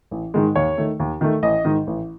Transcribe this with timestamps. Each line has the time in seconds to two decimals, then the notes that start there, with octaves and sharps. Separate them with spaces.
0.11 A1
0.34 G#2 D#3 G#3
0.56 D#2 C#5
0.78 D#3 A3
1.00 D#2
1.21 D#3 A3
1.43 A1 D#5
1.65 G#2 D#3
1.87 A1